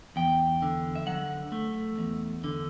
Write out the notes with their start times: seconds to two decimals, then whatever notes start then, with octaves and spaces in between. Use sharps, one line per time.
0.16 E2 G5
0.62 D3
0.96 E5
1.07 F#3 F#5
1.52 A3
1.98 E2
2.44 D3